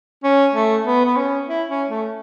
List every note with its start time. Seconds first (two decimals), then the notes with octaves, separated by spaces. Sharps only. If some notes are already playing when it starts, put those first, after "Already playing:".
0.23 C#4
0.54 A3
0.86 B3
1.05 B3
1.16 C#4
1.48 E4
1.69 C#4
1.89 A3